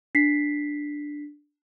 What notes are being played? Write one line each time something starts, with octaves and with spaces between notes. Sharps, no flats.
D4 B6 C7